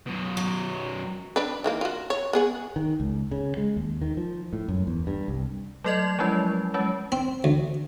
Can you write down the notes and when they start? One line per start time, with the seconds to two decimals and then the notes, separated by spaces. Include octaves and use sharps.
0.06 F#2 B2
0.37 F#3
1.36 D4 B4
1.64 D#3 E3 A#3
1.81 F4 F#4
2.10 C#5
2.33 B3 G#4 F#5
2.76 D#3
3.00 C#2
3.31 C#3
3.57 G#3
3.76 D#2
4.02 D#3
4.17 F3
4.53 A2
4.68 F#2
4.87 E2
5.07 G2
5.28 C2
5.84 F#3 A3 A4 D5 D#5 G#6
6.19 F3 F#3 G#3 C#4 E4
6.74 F#3 G#3 C#4
7.12 C4
7.44 D2